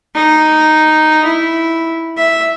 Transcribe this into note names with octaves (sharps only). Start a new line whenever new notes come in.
D#4
E4
E5